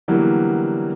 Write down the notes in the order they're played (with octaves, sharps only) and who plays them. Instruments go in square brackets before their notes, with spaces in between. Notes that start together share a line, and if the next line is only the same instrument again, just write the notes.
[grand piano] D3 E3 F#3 G3 A#3 B3